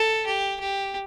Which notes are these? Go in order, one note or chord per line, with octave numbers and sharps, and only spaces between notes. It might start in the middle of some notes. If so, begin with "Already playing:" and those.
Already playing: A4
G4
G4